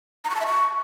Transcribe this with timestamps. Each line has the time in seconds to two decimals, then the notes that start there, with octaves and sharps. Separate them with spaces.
0.24 A#5
0.30 C#6
0.35 A5
0.41 E5
0.46 C#6